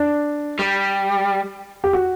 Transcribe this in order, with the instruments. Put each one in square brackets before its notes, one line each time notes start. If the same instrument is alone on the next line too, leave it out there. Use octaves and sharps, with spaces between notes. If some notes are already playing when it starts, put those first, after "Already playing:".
Already playing: [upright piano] D4
[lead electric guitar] G3
[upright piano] G4
F#4